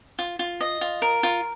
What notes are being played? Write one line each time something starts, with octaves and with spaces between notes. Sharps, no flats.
F4
F4
D#5
F4
A#4
F4